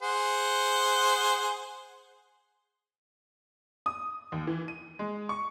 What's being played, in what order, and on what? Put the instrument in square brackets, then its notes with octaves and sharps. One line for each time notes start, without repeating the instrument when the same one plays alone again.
[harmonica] G#4 C5 F#5
[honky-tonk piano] D#6
D#2
E3
D#7
G#3
C#6